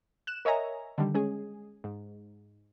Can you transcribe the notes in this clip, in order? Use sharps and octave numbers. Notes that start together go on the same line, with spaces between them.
F#6 E7
A#4 C#5 D#5 E5 G#5 A#5
D3 D#3 G3
G#3 C#4 G#4
G#2